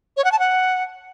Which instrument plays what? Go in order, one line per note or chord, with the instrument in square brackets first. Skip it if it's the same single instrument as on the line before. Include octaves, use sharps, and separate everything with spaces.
[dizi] C#5
F#5
A5
F#5